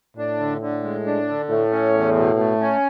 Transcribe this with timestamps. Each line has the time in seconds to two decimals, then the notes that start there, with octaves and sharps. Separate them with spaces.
0.17 A2 D4
0.39 D3
0.61 D3
0.84 G#3
1.06 D4
1.28 D3
1.50 A2 A3
1.72 C#4
1.94 E2
2.16 B2
2.39 A3
2.61 C#4